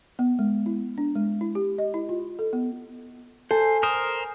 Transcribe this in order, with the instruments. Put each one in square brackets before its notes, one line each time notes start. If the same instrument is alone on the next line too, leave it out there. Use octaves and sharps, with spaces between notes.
[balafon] B3
G#3
E4
D4
G#3
E4
G4
D#5
E4
F4
A4
B3
[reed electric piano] A4 [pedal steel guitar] C5 [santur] G#5
[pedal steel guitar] A#4 C5 [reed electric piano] D#6